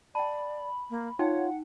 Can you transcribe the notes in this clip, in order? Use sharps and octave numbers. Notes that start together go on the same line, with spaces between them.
D5 G5 A5 B5
A#3
D#4 F4 C#5 F#5 G5